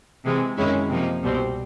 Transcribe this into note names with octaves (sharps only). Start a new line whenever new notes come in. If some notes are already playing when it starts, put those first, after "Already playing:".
C3 E3 G#3
F#2 D#3 G#3 C#4 E4
C3 F3 A#3 D#4
C2 B2 G3 C4